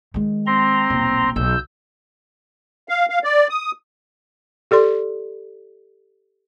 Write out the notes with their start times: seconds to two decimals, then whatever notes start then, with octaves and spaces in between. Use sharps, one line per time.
0.14 D#3 G#3
0.46 C4 A#5 C6
0.90 D#1 B1
1.36 B1 E6 G6
2.89 F5
3.09 F5
3.24 D5
3.50 D#6
4.71 G4 A4 D5 C6